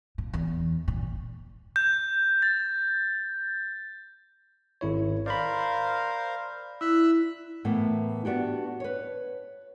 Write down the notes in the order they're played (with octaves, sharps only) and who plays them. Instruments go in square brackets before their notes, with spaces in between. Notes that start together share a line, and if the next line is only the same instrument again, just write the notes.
[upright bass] A#2
E2
A#2
[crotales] G6
A6
[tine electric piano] G#1 E4 C#5
[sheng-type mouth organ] A#4 C5 F5 [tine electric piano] D5 B5
[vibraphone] E4 [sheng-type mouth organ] E5 E6 F#6
[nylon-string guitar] A2 E3 A#3 B3
B3 D4 F#4 G4
B4 C#5